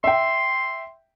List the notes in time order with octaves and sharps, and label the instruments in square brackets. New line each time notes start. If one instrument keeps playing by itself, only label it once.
[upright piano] E5 G5 [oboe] C6